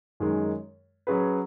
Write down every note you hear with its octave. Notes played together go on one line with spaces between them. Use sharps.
F#2 D#3 G#3
F#3 C#4 G#4 B4